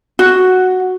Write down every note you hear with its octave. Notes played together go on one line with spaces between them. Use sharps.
F#4